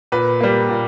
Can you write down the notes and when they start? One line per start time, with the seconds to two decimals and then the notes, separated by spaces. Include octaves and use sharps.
0.12 A#2 B4
0.40 G3 A#3
0.69 A#2